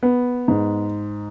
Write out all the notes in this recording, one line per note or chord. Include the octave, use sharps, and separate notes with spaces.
B3
G#2